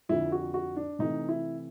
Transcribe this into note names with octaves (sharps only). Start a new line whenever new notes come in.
F2 D3 F3 E4
F#4
F#4
D4
C3 E3 A3 D#4
E4